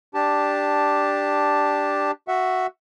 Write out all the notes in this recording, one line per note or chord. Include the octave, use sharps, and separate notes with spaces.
D4 G4 A5
F#4 E5 F#5